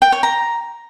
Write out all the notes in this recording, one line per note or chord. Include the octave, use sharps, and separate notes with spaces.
G5
C#5
A#5